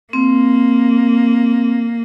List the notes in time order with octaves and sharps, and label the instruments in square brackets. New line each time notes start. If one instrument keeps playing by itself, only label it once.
[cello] A#3 [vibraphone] C4